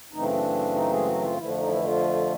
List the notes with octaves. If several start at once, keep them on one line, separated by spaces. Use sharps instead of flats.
F#2 C#3 E3 A3 C4 D#4
D4
D4
D#4
G#3 G#4
F#3 F#4
F3 F4
F2 D3 E3 F3 A3 E4
D4
D#4
E3 E4
F3 F4